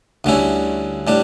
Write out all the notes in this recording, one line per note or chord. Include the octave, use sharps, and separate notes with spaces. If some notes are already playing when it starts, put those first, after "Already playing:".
D2 D3 G3 C#4 E4
A2 G3 D4